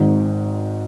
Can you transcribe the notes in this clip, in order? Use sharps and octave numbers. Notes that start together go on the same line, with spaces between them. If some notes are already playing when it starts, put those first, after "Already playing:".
Already playing: G#1 G#2 D#3 G#3 C4